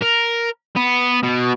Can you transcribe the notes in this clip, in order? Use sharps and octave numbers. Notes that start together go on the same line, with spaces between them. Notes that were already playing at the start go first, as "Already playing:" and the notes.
A#4
B3
B2